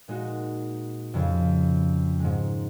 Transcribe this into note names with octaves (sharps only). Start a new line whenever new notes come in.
A#2 G#3 D#4 F#4
F2 C#3 G#3
G#2 D#3 G#3